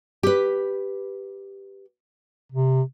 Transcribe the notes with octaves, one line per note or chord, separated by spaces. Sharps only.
G4 B4
C3